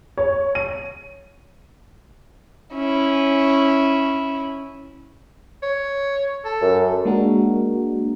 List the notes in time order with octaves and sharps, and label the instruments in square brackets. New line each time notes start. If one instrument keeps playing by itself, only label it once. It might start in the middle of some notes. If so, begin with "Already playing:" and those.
[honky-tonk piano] C#5
D#7
[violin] C#4 E4
[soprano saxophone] C#5
A4
[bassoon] F#2
[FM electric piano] G#3 A#3 D4 F#4 A#4